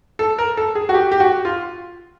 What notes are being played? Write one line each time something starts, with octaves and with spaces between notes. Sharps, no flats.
A4
A#4
A4
G#4
F#4
G4
G4
F#4
F4